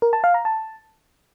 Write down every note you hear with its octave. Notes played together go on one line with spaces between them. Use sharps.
A#4
A5
F5
A#5
A5